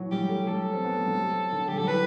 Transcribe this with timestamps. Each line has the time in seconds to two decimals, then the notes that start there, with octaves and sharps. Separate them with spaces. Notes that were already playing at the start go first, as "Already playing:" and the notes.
Already playing: E3 F#3
0.12 G3 G4
0.29 A3
0.47 G3 A4
0.73 C4
0.84 B3
0.95 A3
1.06 G3
1.17 F#3
1.52 D3
1.68 G3 G4
1.78 F#3 A4
1.87 E3 B4